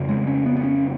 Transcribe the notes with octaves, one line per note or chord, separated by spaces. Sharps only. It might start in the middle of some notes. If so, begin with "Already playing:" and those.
Already playing: F2 C#3
G#3
C#4
B3
B3
C#4